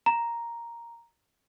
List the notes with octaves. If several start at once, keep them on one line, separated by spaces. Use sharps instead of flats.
A#5